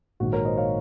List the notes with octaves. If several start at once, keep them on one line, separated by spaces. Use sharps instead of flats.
A#1 G#2 D#3 F#4
A#4 C#5
C5 D#5
C#5 F5